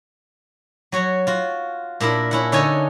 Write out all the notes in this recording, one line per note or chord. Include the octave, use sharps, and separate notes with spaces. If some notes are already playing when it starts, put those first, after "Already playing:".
F#3 F#4 C#5
F4 F#4
A#2 D4 E4 A#4
C#4 E4 F#5
D3 C#4 D#4 A4 C#5 G#5